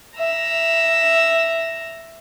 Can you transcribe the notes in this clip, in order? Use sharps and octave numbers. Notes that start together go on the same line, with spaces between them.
E5 A#5